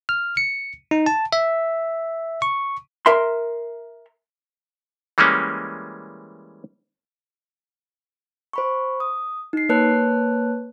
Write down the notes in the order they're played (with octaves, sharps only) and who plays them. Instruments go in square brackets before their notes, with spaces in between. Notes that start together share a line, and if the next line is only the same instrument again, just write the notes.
[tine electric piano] F6
C#7
D#4
A5
E5
C#6
[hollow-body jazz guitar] A#4 E5 C6
[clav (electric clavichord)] E3 G3 G#3 A#3 C#4
[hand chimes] C5 B5 C#6
D#6
D#4 C7
A#3 B4 C#5 A5 F#6